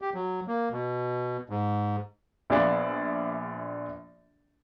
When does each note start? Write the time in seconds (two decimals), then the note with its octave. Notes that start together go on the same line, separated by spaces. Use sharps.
0.02 G4
0.14 F#3
0.47 A#3
0.72 B2
1.50 G#2
2.50 A#1 B3 F4 G#4 D5 E5